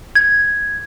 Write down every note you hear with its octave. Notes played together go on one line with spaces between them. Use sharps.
G#6